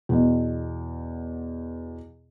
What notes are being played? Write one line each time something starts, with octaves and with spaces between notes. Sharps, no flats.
E2 B2